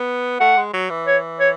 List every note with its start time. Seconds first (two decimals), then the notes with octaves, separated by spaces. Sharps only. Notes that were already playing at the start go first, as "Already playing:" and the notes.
Already playing: B3
0.40 A3 F#5
0.57 G#3
0.74 F#3
0.90 E3
1.07 C#5
1.39 C#5